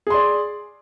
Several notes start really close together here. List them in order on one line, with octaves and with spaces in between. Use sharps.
G#4 C6 D5